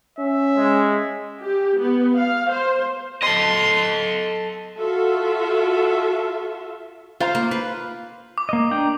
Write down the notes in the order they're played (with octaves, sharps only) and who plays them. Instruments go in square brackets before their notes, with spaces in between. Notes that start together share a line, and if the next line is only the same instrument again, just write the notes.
[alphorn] C#4 [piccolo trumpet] E5
[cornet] G#3
[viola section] G4
B3
F5
C5
[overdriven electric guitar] A4 D#5 [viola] C6
[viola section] F4 F#4 A4 E5
[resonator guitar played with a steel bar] F4 F5 A#5 [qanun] C5
[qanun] A#3
B4
[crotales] D6
[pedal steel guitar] A#3 D#5
D4 G5 A#5